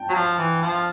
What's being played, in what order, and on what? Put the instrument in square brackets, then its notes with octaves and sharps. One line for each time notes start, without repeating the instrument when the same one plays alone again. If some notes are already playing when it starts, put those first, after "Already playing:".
Already playing: [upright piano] G5 A5
[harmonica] F#3
F3
E3
F3